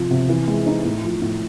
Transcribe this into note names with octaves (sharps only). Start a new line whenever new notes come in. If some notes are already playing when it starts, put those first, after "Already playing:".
Already playing: C3 F3
C3
E3
G#3
D#4
A2
F3
A2